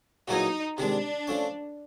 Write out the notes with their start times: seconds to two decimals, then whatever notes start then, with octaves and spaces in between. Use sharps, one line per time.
0.28 A#2 F#3 B3 D#4 E4 G#4
0.78 C3 D#3 G#3 D4
1.27 F3 A3 C#4